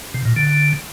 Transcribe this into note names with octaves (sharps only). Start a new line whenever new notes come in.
C3
A#2
D3